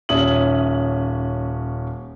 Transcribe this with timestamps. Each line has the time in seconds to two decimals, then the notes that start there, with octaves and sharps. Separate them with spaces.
0.09 D#1 C#4 E5 D#6 F#7